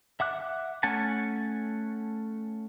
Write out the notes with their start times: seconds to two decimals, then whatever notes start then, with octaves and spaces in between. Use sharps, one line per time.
0.20 E5 F#5 D6 F#6
0.83 A3 C#4 F#5 G#5 A5